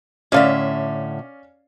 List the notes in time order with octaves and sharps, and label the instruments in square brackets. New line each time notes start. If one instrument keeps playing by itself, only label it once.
[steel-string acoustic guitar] A2 D3 E5 [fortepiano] C#4 D5 F5